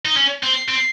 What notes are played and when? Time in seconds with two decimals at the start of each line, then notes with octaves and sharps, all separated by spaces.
0.05 D#4
0.16 C#4
0.43 C4
0.68 C4